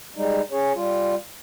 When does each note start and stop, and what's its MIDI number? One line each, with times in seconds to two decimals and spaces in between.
0.16 0.41 55
0.16 0.41 56
0.16 0.41 63
0.52 0.73 61
0.52 0.73 68
0.52 0.73 73
0.75 1.15 55
0.75 1.15 65